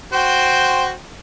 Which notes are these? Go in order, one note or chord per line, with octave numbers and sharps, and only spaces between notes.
F#4 C5 G5